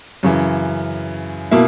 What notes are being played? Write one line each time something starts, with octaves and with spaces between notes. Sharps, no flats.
F#2 C#3 E3
B2 A#3 E4